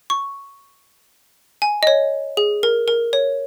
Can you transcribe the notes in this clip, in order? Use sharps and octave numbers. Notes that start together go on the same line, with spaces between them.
C#6
G#5
D#5
C#5
G#4
A#4
A#4
C#5